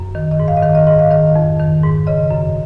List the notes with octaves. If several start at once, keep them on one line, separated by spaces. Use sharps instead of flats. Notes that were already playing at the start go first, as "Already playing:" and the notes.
Already playing: F#2
D#3
D#5
G#2
F5
D#5
D#3 F5
D#5
G#2 D#5
F5
D#3 D#5
F2
D#3
G#2
C#3 D#5
F#2